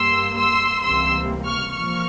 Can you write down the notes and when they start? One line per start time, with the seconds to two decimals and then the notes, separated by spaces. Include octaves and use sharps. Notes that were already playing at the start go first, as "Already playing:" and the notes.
Already playing: G2 G3 A#3 C6 E6
0.37 C6 E6
0.83 C#2 C3 E3 G3 A#3 C6 E6
1.45 C#6 F6
1.76 A#2 F3 A#3 C#6 F6